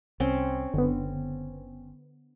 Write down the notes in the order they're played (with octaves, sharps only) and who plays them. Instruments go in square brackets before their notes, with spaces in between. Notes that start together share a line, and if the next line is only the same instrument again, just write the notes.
[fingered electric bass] C2 [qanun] C4 C#4 G5
[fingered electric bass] F#1 [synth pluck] D3 B3